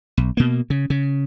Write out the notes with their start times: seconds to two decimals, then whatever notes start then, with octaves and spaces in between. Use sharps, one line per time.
0.17 B1
0.37 B2 A#3
0.70 C#3
0.90 C#3